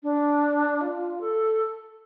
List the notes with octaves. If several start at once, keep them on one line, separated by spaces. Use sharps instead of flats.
D4
F4
A4